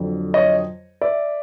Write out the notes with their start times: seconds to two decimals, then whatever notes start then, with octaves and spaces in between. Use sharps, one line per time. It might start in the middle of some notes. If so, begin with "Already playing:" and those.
Already playing: F2 D3 F#3
0.34 C#5 D#5
1.01 D5 E5